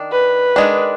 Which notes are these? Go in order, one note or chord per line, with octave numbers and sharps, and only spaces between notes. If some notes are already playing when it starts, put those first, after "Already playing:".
Already playing: D#3 D4
B4
D#3 G#3 D4